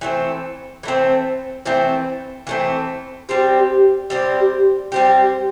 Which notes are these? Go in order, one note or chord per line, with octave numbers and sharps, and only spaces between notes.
E3 A3 C4
E3 A3 C4
E3 A3 C4
E3 A3 C4
G3 C4 G4
G3 C4 G4
G3 C4 G4